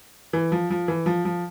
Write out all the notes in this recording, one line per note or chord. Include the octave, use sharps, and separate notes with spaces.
E3
F3
F3
E3
F3
F3